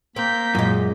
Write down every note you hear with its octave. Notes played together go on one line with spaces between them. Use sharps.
A#3 C4 G6 B6
F#2 A#2 G#3